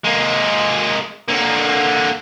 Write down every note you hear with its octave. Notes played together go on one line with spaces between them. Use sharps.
G#3 A#3
D3 A#3